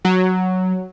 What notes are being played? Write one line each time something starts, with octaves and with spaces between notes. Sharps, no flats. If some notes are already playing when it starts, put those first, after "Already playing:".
F#3